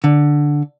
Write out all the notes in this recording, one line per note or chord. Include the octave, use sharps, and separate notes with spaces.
D3